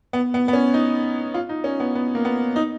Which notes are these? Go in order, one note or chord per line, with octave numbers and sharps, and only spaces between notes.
B3
B3
B3
C#4
D#4
F4
D#4
C#4
B3
B3
A#3
B3
D#4